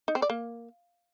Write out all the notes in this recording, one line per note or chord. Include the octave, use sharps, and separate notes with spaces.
D#4
C4
D5
A#3